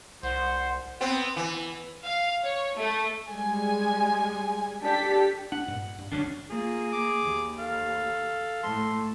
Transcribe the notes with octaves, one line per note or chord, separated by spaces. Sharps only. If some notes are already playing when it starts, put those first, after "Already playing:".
C2 C5 F#5
B3 C4
E3
F5
C#5
A3
G3 G#3 G#5
D4 G4 A4 B6
D4 F#5
G2 A#2
G2
G1 C#2 D3 F#3 C#4 D4
A#3 F4 G#4
D6
D#2
A4 F5
A2 A4 C6